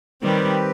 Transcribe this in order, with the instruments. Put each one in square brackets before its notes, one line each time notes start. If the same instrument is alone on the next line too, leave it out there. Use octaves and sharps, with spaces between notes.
[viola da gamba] D#3 G3 [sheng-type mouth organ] C4 G4 B4